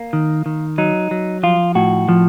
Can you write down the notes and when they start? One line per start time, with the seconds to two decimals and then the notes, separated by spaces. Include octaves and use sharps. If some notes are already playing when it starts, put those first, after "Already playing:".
Already playing: A#3
0.13 D#3
0.46 D#3
0.78 F#3 D#4
1.11 F#3
1.43 F3 F4
1.75 A2 F#4
2.09 F3